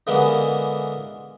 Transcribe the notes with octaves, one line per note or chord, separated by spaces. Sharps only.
D3 E3 G#3 A#3 B3